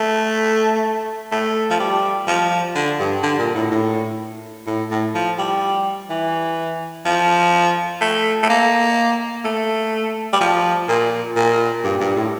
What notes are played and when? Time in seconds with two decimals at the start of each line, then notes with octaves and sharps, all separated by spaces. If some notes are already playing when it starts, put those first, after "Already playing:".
Already playing: A3
1.32 A3
1.70 F3
1.79 G3
2.27 F3
2.75 D3
2.99 G2
3.23 D3
3.39 A#2
3.55 A2
3.71 A2
4.66 A2
4.91 A2
5.14 F3
5.38 G3
6.10 E3
7.06 F3
8.01 A3
8.43 A3
8.49 A#3
9.45 A3
10.33 G3
10.40 F3
10.88 A#2
11.36 A#2
11.84 G2
12.00 G2
12.16 A2